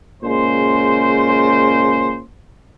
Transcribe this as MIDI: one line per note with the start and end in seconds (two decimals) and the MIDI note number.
0.23 2.20 46
0.23 2.20 49
0.23 2.20 56
0.23 2.20 72